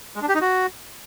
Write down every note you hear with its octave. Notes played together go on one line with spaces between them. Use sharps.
G#3
D4
G4
D#4
F#4